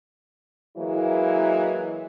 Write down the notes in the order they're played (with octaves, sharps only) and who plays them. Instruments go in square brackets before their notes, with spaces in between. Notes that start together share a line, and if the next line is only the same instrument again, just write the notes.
[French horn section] E3 F#3 G#3 A#3 E4